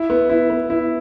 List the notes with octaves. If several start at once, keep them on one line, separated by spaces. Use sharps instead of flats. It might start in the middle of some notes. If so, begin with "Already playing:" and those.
Already playing: E4
B3
E4
B3
E4